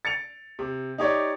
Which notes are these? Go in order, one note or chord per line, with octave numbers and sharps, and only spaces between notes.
A6 C#7 D7 F7
C3
D#4 G4 C#5 D5